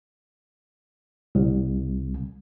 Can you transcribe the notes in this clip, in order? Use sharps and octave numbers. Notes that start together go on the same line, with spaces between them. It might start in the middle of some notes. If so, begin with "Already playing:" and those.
C2